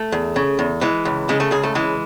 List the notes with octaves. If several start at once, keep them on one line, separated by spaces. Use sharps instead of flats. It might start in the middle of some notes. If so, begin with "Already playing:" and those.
Already playing: A3
E2
C#3
E2
E3 G#3
C#2
C#3 G#3
A3
C#2 G#4
A3
E3 G#3